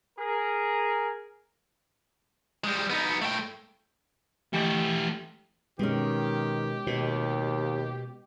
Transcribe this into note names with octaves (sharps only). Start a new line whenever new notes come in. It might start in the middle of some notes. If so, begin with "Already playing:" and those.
G#4 A#4
G3 G#3
B3 D#4
A3 G5
E3 A3 G4 D#5
B2 D#3 G#3 C#4 G4
D#2 B2